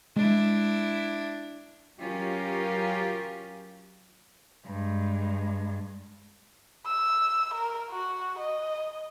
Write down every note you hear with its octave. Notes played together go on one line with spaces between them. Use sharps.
G#3 D4 E4
F#3 C#4 F4 G4 A#4
G2 G#3
E6
A#4
F#4
D#5